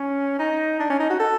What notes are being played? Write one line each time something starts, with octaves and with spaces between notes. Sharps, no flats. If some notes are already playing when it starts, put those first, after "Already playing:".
Already playing: C#4
D#4
D4
C#4
D#4
F#4
A4